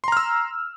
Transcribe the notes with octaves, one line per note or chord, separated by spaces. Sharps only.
A#5 C6 E6 F6